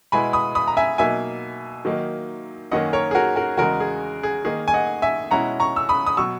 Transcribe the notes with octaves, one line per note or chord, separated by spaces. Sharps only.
B2 G#3 B3 E4 G#5 B5
B5 D#6
B5 D#6
A#5
E5 G#5
B2 F#3 A#3 D#4 E5 G#5
D#3 F#3 A#3 D#4
F#2 D#3 A#3 C#4 D#5 F#5
A#4 C#5
G#4
F#4 A#4
F#4 A#4
E2 C#3 G#3 F#4 A#4
G#4
G#4
D#3 A#3 D#4 G#4
G#5
D#5 F#5
E5 G#5
B2 G#3 C#4 E4 F#5 A#5
A#5 C#6
E6
B5 D#6
D#6
B2 F#3 C#6 E6